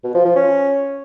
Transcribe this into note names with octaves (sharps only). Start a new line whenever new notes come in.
B2
F3
F3
C#4